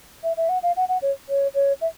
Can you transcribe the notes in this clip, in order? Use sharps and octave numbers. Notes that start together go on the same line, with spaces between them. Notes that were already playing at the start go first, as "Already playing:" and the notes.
E5
E5
F#5
F5
F#5
F#5
C#5
C#5
C#5
E5